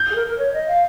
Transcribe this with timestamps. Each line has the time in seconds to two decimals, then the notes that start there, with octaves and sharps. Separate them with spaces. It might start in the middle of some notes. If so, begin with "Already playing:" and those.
Already playing: G6
0.11 G#4
0.15 A#4
0.27 A#4
0.38 C#5
0.53 D#5
0.68 F5